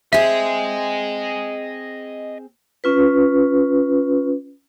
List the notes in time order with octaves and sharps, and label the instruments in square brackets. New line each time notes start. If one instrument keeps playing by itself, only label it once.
[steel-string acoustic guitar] C4 G#4 [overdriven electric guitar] D#5 G#5 [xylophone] E5
[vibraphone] C#4 F4 B4